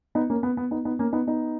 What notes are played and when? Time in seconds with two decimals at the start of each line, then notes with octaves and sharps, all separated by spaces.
0.15 B3 D#4
0.30 A#3 C#4
0.43 B3
0.57 B3
0.71 B3 D#4
0.85 B3 D#4
0.99 A#3 C#4
1.13 B3 D#4
1.27 B3 D#4